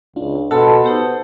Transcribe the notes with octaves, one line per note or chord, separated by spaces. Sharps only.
C#2 D4 F4
B2 A4 F#5 A5 B5 C6
B3 D#4 G4 C5